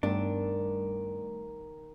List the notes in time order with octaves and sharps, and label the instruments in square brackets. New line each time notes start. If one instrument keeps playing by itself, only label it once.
[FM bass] G2 [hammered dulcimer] D#3 [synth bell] G3 A3 B3 [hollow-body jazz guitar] D4